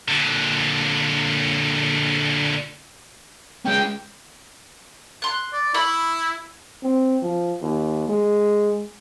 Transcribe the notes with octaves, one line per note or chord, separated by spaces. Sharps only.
A#2 D3
G#3 C#4 G5
C6 F#6
D5
E4 B5 C#6
C4
F3
D#2
G#3